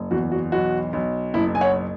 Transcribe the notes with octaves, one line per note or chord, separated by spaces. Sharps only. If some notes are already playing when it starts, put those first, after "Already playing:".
Already playing: F#1
E2 F#4
F#4
B1 F#4
B1
F#1 E4
G#5
C#5 F#5